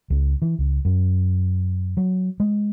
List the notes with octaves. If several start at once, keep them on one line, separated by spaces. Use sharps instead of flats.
C#2
E3
C#2
F#2
F#3
G#3